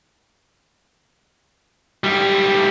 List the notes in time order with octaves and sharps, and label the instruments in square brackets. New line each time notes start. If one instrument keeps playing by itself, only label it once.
[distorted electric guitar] G#2 G3